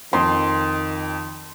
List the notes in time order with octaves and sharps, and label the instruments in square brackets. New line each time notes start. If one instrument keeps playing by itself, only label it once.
[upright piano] F2 [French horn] D#3 [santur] C6